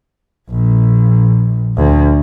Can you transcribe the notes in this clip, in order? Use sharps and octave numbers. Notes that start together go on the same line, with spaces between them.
A#1
D2